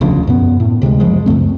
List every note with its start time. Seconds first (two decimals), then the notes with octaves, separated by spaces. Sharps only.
0.01 E1 D2 C#3 F3
0.27 F#2 B2 B3
0.60 A2
0.82 D2 C3 G3 G#3
1.00 F#1 F3 G#3
1.26 C#2 F#2 A3 C4